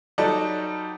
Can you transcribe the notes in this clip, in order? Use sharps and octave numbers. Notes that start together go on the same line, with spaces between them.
F#3 G3 D#4 F#4 A4 D5